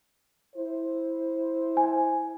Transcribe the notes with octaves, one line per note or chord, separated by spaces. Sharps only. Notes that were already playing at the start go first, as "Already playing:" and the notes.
E4 C5
G#5